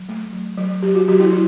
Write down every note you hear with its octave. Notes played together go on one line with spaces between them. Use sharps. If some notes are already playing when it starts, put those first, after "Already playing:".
Already playing: F#3
A3
F#3
F#3
F#3 G4
F#4
F#3 G4
E4
F#3